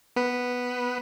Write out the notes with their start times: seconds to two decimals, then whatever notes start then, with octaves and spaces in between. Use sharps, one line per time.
0.16 B3 B4